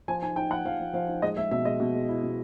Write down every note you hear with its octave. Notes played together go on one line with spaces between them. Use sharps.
F3 G#5
D#4 G#5
D#4 G5
F3 F#5
F3 F5
F3
F3 F5
D#4
G#3 D#5
G#3 E5
B2 E5
G#3 D#5
B2
G#3
E4
B2